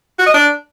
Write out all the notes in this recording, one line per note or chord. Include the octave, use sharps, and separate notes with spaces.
F#4
D#5
D4